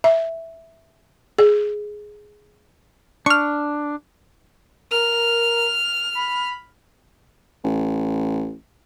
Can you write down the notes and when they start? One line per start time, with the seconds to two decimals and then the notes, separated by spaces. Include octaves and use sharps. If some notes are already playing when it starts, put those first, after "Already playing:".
0.04 E5
1.38 G#4
3.26 D4 C#6 F6
4.91 A#4 F6
6.15 B5
7.64 A1